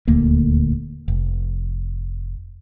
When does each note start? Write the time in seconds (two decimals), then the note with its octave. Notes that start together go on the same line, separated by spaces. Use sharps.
0.07 D#1 D2 A3 A#3
1.08 F1